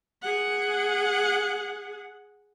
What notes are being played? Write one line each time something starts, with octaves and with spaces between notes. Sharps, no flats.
G#4 F#5